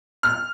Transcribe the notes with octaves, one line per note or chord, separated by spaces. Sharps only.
F6